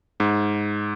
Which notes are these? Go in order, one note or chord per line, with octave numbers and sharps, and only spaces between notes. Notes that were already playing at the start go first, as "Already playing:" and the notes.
G#2